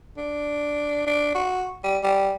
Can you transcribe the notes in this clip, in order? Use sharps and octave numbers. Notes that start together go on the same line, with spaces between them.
D4
D4
F#4
G3
G3